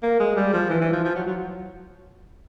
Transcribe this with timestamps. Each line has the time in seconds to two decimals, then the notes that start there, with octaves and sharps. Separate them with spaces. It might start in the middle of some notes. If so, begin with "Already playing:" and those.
0.03 A#3
0.20 G#3
0.36 G3
0.53 F3
0.70 E3
0.81 E3
0.93 F3
1.04 F3
1.15 F#3
1.27 F#3